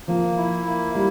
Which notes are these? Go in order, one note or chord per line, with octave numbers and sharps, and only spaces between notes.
F3 A#3
E4
A#3
G3 E4